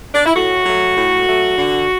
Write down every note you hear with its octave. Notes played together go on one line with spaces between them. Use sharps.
D4
E4
A2 F#4
F#3 A3
A2
F#3 A3
D3